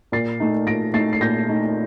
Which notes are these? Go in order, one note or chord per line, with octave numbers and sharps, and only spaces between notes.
A#2 A6 C7
A3 D#4
A#2 A#6 D7
A3 D#4 A6 C7
C7
A#2 G6 A#6
A3 D#4